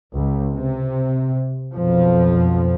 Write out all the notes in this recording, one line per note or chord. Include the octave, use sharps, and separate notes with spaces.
C#2
C3
B1 F2 F3